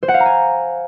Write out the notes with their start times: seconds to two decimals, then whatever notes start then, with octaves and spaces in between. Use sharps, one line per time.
0.03 C5
0.08 F#5
0.14 F5
0.20 A#5
0.26 G#5